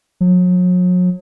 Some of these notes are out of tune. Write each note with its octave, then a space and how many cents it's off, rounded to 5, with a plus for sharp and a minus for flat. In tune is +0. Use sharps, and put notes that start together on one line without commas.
F#3 -40